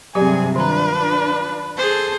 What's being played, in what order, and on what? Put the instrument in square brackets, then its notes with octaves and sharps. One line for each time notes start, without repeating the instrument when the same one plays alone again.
[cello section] G2 C3 G#4 [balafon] F#3 G4 D5 [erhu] G#5
[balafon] D#3 A#5 [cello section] D4 F4 [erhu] B4
[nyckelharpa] G#4 C5 [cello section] A4